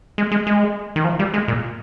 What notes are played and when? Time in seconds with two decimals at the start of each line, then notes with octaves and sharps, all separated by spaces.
0.18 G#3
0.32 G#3
0.47 G#3
0.96 D#3
1.04 F3
1.19 G3
1.34 G#3
1.48 A#2